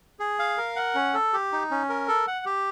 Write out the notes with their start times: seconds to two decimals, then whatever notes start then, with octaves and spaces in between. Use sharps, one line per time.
0.19 G#4
0.39 F5
0.57 A#4
0.76 F#5
0.95 C#4
1.14 A4
1.33 G4
1.52 D#4
1.71 C#4
1.89 A#4
2.08 A4
2.28 F#5
2.46 G4